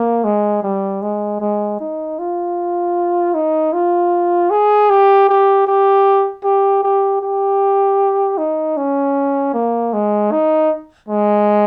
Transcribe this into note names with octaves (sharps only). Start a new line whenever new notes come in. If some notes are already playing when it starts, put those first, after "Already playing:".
Already playing: A#3
G#3
G3
G#3
G#3
D#4
F4
D#4
F4
G#4
G4
G4
G4
G4
G4
G4
D#4
C#4
A#3
G#3
D#4
G#3